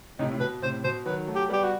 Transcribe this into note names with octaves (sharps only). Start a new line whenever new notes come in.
A2 C3 D#4
A2
B2 B4
A2 C3 C5
B2 C5
D#3 F#3 B4
F#3 A3
G4
G3 B3 G4
F#4